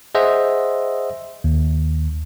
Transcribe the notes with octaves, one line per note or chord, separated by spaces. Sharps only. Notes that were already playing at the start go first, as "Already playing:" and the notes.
G#4 C5 D#5 E5 F#5
D#2